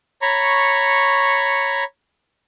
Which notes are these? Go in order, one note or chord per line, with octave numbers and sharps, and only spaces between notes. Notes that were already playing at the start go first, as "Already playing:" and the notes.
C#5 A#5 B5 C#6